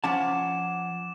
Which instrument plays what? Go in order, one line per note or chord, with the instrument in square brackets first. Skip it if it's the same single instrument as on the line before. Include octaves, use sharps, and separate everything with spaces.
[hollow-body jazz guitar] F3 C#4 A5 [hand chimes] F#5 G#5 A6 [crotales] D6 E7